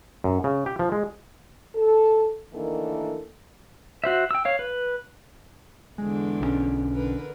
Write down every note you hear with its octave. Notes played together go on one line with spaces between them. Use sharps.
F#2
C#3
G4
F3
G#3
A4
D2 D#3 E3 A#3 D4 A4
F#4 C5 E5
G5 E6
C#5 F5
B4
E2 D3 G#3
B1 F3 C#4
D3 A#4 B4